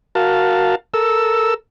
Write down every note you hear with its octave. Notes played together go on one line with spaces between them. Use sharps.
F#4 A#4 F5 A5
A4 A#4 E6